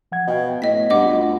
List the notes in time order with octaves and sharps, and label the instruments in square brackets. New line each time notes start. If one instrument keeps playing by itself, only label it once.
[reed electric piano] F3 F#5 G#6
[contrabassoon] B2 [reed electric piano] D#5 F5 G5
[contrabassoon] A2 [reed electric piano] B3 [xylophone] D#5 B6
[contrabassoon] G2 [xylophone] D#5 F#5 D6
[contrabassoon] D2 [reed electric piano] F4